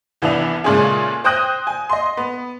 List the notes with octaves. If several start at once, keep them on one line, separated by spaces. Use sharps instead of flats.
C2 E3 B3 D4 E4 F7
A#2 C#3 G#3 A3 C#4 G#4
C5 G5 D#6 F#6 A#6 D#7
G#5
D#5 C6
B3